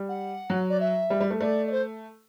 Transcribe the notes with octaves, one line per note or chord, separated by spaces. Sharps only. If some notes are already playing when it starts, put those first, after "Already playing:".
Already playing: G3
F#5
F#3
D5
E5
G3
G3
A3
A3 D5
D5
C5